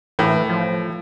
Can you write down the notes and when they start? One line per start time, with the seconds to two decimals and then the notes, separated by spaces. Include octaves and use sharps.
0.19 A2 E3
0.50 F3